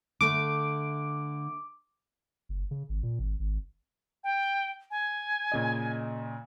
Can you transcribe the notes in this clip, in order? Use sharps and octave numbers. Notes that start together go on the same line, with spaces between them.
D3 A3 D6
F#1
C#3
G#1
A#2
G#1
G#1
G5
G#5
A#2 C#3 D#5